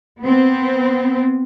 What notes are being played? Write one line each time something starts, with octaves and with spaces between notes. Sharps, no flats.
B3 C4